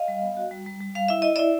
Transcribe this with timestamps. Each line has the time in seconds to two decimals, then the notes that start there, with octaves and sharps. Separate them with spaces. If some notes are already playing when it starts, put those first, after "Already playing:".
Already playing: D#5 F5
0.08 G3
0.22 B3
0.37 F#4
0.51 G3
0.66 G3
0.80 G3
0.95 G3 F5
1.08 E4 E5
1.22 E4 D#5
1.36 E4 D5 E5